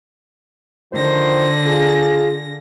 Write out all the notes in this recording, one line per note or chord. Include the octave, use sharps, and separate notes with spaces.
D3 D#3 F3 C5 A#6
F4 G#4